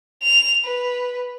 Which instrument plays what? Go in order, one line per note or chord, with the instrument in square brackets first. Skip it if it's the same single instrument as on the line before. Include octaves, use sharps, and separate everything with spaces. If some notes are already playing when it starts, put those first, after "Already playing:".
[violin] F7
B4